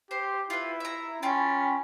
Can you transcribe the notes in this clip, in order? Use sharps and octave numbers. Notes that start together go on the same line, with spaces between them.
G4 C5
E4 F4 B4
E5 A#5
C#4 F4 G5 A5 B5